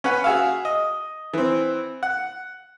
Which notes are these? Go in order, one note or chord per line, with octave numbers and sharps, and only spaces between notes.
C#4 B4 F#5
F#4 G#4 E5 F5
D#5
E3 C4
F#5